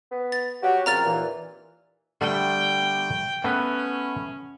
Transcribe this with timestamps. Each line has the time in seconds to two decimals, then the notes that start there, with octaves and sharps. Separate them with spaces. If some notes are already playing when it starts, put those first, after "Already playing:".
0.12 B3
0.32 A6
0.63 F#3 F#4 G4
0.86 A#2 C#3 F3 C4 A#5 F6 A6
1.05 D#2 A#2 E3
2.21 D3 G3 A3 G5
3.44 A3 B3 C#4 B4